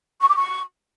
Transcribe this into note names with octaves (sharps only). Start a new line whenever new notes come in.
C#6
D6
C#6